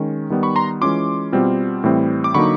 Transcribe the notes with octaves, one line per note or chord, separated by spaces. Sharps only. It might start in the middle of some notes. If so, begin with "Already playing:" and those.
Already playing: D#3 G#3 C#4
D#3 G3 B3
B5 C#6
A#5 C6
E3 G#3 C#4 F4 C6 D6
B2 G3 C4 F4
A2 E3 G3 C4
D6
D3 F#3 A#3 D#4 B5 C#6